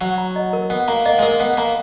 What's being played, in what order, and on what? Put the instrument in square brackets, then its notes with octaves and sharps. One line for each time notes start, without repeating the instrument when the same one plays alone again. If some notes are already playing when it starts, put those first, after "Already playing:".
[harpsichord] F#3 [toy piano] F#5
[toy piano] A#5
D#5
A#4
[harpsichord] B3 [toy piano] F#5
[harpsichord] A#3 [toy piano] A#5
[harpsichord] A#3 [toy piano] D#5
[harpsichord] G#3
[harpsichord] A#3 [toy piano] A#4
[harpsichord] B3 [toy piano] F#5
[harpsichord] A#3 [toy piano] A#5